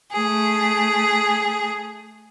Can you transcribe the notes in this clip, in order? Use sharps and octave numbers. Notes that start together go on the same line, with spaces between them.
A3 G#4